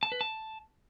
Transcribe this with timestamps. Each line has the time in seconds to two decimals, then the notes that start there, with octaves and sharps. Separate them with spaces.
0.03 A5
0.12 B4
0.21 A5